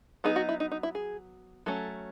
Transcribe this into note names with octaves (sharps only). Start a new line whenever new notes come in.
F#3 B3 D#4 G#4
F#4
E4
D#4
D#4
E4
G#4
F#3 A3 C#4 A4